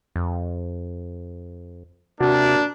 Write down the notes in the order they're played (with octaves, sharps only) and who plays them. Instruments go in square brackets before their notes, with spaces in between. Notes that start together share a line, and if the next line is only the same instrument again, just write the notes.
[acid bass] F2
[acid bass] C3 [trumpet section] A#3 D4 [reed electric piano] F#4